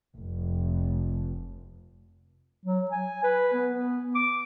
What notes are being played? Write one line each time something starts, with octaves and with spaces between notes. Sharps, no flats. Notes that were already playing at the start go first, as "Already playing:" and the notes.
F1
F#3
G#5
B4
B3
D6